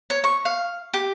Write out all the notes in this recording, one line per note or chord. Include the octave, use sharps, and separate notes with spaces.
C#5
C#6
F5
G4